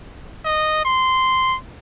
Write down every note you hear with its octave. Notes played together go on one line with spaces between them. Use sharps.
D#5
C6